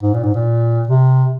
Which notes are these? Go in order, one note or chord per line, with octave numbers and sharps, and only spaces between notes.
G#2
A#2
G#2
A#2
C3